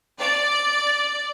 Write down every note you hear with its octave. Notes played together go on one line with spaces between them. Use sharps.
D5